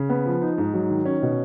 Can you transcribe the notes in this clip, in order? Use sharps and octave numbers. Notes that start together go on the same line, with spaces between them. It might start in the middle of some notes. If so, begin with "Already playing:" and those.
Already playing: C#3
B3
F3
D#4
G#2
F#3
D#3
C#4
B2